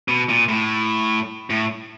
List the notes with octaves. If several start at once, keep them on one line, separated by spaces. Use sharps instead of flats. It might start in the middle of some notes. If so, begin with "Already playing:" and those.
B2
A#2
A2
A2